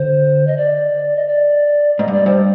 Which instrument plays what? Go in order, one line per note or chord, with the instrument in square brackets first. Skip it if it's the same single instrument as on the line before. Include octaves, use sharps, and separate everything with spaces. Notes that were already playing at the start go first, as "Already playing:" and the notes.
Already playing: [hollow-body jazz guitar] D3 [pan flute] C5
[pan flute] D#5
D5
D#5
D5
[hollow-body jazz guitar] G#2 [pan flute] D#5
[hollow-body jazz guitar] G2
[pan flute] D5
[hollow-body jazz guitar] G2 [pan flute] C5